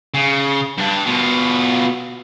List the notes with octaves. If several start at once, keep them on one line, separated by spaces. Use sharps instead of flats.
C#3
G2 D4
B2 F4